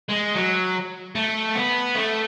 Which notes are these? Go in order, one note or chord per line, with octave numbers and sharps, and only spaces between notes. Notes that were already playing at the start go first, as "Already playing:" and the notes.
G#3
F#3
A3
B3
A3